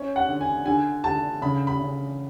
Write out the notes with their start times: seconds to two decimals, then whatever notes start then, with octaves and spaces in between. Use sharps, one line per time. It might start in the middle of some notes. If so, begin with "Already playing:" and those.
Already playing: C#4
0.16 F#5
0.28 D3
0.41 G#5
0.66 D3 G#5
1.04 D3 A5
1.42 C#3 B5
1.67 B5
1.80 C#3